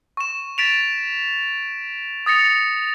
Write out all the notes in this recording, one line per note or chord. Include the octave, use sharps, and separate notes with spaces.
C#6 E7
A6 B6 D7 E7 F7
D#6 A6 A#6 C#7 F7